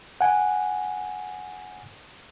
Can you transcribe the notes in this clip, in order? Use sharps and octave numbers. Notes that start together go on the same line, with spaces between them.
F#5 G#5